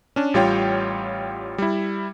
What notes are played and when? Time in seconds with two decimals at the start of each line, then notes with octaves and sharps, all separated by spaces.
0.16 C#4 D4
0.34 A1 G3 F4 C#5 G5
1.58 G3 E4